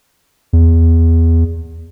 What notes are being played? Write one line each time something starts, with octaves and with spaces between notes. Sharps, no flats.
E2